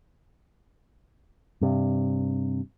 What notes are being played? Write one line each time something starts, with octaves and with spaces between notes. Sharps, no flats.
G2 C3